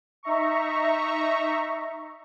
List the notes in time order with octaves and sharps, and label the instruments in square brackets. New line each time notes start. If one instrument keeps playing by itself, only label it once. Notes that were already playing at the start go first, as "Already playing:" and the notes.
[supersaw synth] D#4 E5 A#5 C#6